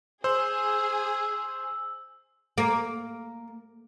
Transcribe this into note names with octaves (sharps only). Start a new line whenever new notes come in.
G#4 C5 E6
A#3